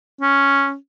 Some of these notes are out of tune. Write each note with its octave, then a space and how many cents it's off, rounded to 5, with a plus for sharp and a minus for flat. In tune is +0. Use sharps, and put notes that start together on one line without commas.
C#4 +0